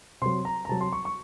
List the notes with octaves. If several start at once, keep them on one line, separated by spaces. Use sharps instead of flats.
C3 F#3 C6
A#5
A#5
C3 F#3 A5
C6
C#6
C#6